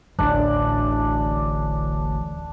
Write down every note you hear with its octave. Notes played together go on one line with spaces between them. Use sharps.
D1 A1 D3 D4